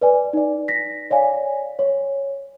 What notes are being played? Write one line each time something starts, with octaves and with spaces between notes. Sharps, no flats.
B4 D5 G#5
D#4 D5
A#6 B6
C#5 D5 F5 G#5
C#5